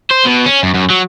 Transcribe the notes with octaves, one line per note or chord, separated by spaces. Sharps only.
C5
B2
C#4
F#2
F#2
F#3